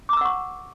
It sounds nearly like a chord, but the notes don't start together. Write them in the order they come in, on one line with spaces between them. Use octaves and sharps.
D6 A#5 E6 F#5 C#6